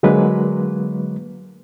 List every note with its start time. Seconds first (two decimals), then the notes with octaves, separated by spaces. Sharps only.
0.03 D3 F#3 G#3 A#3 B4